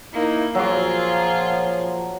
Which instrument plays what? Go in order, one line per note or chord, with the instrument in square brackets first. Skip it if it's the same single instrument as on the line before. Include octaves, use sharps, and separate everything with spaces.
[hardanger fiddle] A#3 [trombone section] D#4 E4
[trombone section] A#2 F3 [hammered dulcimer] F#3 D6 [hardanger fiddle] F4 G#4